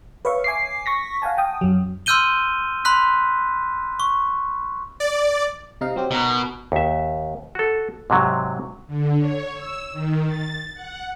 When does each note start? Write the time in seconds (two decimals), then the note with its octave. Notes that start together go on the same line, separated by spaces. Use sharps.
0.25 B4 C#5 E5 F5 C#6
0.44 G#5 D6 C7
0.86 C#6 A#6 B6
1.22 F5 F#5 G#5 A5
1.38 G5 D#6
1.61 F#2 F#3
2.06 C6 E6 F6 G6 D#7 G7
2.85 B5 C6 F#6 B6
4.00 C#6
5.00 D5
5.81 C3 D#4 F5
5.96 F#3 C4 G4
6.11 B2 D#4 A#4
6.72 D#2 E5
7.55 F#4 A4
8.10 G#2 C3 F#3
8.87 D3
9.18 C#5
9.54 E6
9.92 D#3
10.26 A6
10.74 F#5